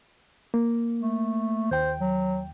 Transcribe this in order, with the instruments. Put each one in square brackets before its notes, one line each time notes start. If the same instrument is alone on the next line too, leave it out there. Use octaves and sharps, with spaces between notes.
[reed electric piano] A#3
[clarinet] A3
[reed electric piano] D#2 G5 [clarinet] C5
[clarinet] F#3